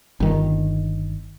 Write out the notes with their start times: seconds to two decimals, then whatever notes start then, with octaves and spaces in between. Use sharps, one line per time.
0.20 G1 D#3